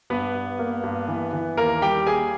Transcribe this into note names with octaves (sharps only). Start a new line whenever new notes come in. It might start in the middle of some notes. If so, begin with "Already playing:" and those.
G2 B3 B4
G2
A#3
G2
E3
E3
D#2 A#3 A#4
G3 G4 G5
A#3 G#4 G#5